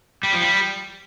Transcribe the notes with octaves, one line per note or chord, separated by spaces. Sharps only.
G3
F3
G3